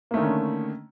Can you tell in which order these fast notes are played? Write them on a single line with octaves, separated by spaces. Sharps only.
A#3 A3 D#3 D3 C#4